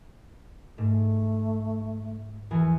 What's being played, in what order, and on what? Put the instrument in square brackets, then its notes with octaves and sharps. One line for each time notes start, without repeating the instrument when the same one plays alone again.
[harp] G#2 [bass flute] A3
[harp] E2 E3 G#5